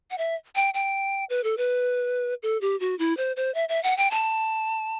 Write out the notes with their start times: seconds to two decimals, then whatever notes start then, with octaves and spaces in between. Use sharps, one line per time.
0.11 F#5
0.18 E5
0.55 G5
0.74 G5
1.30 B4
1.44 A4
1.58 B4
2.43 A4
2.61 G4
2.80 F#4
2.99 E4
3.17 C5
3.36 C5
3.55 E5
3.69 E5
3.83 F#5
3.97 G5
4.11 A5